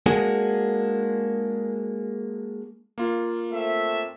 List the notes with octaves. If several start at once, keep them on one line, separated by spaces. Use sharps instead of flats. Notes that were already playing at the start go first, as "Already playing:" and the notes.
G#3 A#3 D4 F#4 G#4
A#3 F4
A3 C4 E5